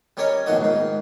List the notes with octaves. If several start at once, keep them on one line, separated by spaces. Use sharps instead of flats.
G3 C#4 A#4 C#5 D#5
A#1 B2 D#3 F#4 D#5
G#2 D#3